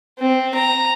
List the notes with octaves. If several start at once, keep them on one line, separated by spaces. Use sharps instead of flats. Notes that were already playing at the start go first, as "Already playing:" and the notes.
C4
A#5